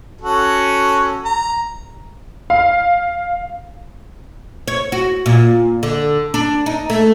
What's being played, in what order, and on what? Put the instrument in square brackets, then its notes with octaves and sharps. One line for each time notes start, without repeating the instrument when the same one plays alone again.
[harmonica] C#4 F#4 A4
A#5
[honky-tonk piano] F5
[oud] C#5
F#4
A#2
D3
D4
D#4
A3